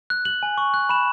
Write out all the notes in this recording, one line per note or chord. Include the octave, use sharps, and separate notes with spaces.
F#6
F#6 F#7
G#5
C#6
F#6
B5 E7